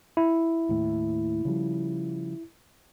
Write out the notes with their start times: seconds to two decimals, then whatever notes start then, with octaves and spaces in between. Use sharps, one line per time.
0.17 E4
0.69 D#2 A2
1.45 C#3 F3 G3